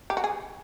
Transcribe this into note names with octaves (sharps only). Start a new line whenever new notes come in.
G4
F#4
G#4